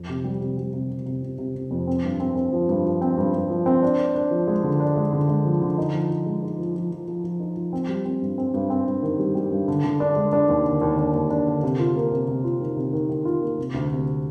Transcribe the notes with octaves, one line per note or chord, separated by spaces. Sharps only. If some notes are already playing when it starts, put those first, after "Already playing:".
Already playing: F2
C3
G3
C3
G3
C3
C3
C3
C3
C3
C3
F2
C4
G2
C4
C4
F3
G2
F3
C4
G2
G2
F3
C4
D4
D4
D4
F3
G#3
D3
D4
G#3
D3
G#3
F3
D3
D#4
F3
F3
G#3
D#4
F3
F3
F3
F3
F3
D#4
F3
C4
G3
C4
G2
C4
G2
C4
G2
D#3
G3
G3
G2
D3
D3
D4
G#3
D4
D#2
D3
D#2
D4
D#2
D4
D3
C3
F4
A#3
C3
C3
F4
D#3
C3
D#3
D#3
F4
A#3
C3
D2
C3